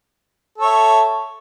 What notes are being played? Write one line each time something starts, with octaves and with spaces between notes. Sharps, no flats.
A4 C#5 E5